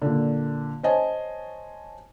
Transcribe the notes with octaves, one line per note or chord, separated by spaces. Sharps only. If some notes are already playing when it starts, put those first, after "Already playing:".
A#2 D3
C5 C#5 D#5 G#5 A5